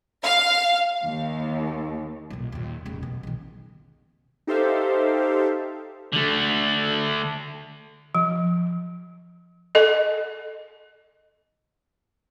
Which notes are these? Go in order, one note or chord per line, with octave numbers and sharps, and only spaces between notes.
F5
D#2
B1 A#2
D#2 A#2
F1 C#3
B2
B1 D#3
D#4 G4 A4 C5 E5 F5
D3 A3
F3
A4 D#5